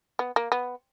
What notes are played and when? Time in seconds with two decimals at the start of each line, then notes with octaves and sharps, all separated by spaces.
0.19 B3
0.36 A#3
0.52 B3